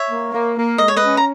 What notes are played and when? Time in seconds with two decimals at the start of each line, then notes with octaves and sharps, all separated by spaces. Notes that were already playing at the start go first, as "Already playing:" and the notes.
Already playing: C#5 E5
0.10 A#3
0.32 A#3
0.55 A#3
0.78 G#3 D#5
0.88 C#5
0.96 C#4 B4 D#5
1.17 A#5